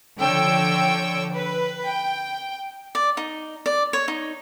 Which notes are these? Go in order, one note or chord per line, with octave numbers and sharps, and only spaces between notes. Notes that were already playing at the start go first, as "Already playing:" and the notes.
D3 F3 C#5 G5 E6
B4
G5
D5
D#4
D5
C#5
D#4